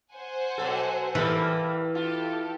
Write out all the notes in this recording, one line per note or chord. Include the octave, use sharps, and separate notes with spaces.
C5 F#5 G#5
B2 F#3 A4
E3 G3 A#3 A4
F4 G4 A4